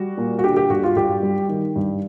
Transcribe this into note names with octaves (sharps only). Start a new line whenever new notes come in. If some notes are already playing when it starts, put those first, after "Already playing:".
Already playing: G3 F#4
A#2
F#4
D3 G4
G4
G2 F#4
F4
G2 G4
G3
D#3
G2